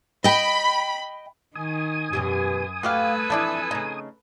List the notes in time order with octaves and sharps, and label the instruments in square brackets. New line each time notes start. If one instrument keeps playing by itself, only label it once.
[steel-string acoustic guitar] D#5 G5 [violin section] B5
[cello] D#3 [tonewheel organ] G#5 D#6
[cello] F#2 [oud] B2 E3 G4
[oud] A3 [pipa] F#4 G4 F5 [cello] A4 B4
[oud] E3 F3 C4 [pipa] A3 D4 E4
[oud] C#3 A3 [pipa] D#4